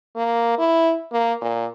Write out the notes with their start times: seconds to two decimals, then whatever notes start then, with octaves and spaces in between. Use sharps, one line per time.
0.16 A#3
0.58 E4
1.12 A#3
1.41 A#2